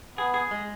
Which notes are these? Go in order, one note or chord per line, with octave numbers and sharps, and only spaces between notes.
B3 G#4
G#4
G#3